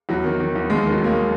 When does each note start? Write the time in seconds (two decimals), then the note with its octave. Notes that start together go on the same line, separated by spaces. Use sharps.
0.09 E2 F#3
0.24 D#3
0.40 D#3
0.55 E2
0.70 D#2 G#3
0.86 D#3
0.91 F#3
1.01 D#3 A#3
1.11 G#3